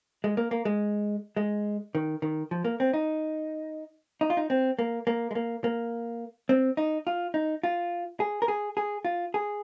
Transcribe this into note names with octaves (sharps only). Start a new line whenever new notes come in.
G#3
A#3
A#3
G#3
G#3
D#3
D#3
F3
A#3
C4
D#4
D#4
F4
D#4
C4
A#3
A#3
G#3
A#3
A#3
C4
D#4
F4
D#4
F4
G#4
A#4
G#4
G#4
F4
G#4